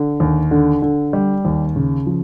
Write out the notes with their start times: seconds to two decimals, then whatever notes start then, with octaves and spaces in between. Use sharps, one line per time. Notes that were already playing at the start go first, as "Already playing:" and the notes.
Already playing: D3
0.20 D#2
0.51 D3
0.82 D3
1.13 G3
1.45 D#2
1.76 C#3
2.06 F3